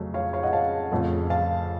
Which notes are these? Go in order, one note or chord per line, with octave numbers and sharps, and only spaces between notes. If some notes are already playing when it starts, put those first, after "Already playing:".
Already playing: F2 C#3 F#3 A3
C#5 F5
C#5 F5
D#5 F#5
F5 A5
F2 C#3 A3
F5 A5